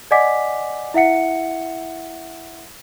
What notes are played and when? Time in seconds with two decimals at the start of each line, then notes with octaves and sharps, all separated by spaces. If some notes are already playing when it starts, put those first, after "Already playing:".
0.11 D5 D#5 F#5 G#5 D6 B6
0.94 E4 E5 F#5 C#7